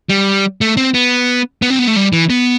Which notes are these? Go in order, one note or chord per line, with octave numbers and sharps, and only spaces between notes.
G3
A3
C4
B3
B3
C4
B3
A3
G3
E3
B3